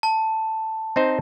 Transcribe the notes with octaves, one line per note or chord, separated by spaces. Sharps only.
A5
C4 D#4 C5